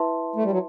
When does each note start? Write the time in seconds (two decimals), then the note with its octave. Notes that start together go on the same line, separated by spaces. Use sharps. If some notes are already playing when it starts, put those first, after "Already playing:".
Already playing: E4 B4 E5 A5 C6
0.36 A3
0.43 G3
0.51 F#3